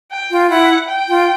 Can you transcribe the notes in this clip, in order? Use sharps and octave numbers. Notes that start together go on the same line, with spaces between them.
G5
F4
E4 F#5
G5
F4